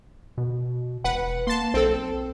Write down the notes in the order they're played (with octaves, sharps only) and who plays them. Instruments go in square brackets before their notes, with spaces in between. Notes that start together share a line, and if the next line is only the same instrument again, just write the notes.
[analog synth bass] B2
[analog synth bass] E1 [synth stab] B4 F#5
[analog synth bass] A#3 [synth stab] A5 C6
[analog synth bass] B1 [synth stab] C4 A4